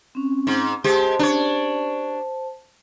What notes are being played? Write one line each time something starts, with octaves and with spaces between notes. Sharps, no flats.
C4 C#4
G#2
G#3 G4 C5 A5
D4 C#5